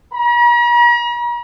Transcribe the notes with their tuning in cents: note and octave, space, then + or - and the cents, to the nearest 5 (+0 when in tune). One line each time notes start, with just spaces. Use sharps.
A#5 +45